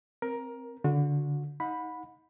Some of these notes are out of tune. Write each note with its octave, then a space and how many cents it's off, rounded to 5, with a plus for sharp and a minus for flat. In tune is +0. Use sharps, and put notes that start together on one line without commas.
C4 +0 A#4 +15
D3 -20 F#4 -30
D#4 +30 F#5 -30 B5 +0